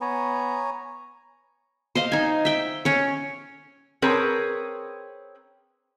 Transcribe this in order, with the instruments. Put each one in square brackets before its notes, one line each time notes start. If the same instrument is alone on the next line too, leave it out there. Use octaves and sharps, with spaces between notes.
[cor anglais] B3 [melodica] C#5 G#5 A#5
[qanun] C5 D#5 F5
D#4 G#5
E5 G5
C#4 C#5
[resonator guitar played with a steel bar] C4 G#4 A#4 B4 C#5